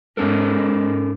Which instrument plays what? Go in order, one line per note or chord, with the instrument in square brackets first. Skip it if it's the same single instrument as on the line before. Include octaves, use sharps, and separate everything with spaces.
[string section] G#2 [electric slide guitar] C#4 A4 A#4